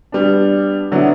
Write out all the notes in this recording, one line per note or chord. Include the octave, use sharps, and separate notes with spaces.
G3 B3 D4
D3 F#3 B3 E4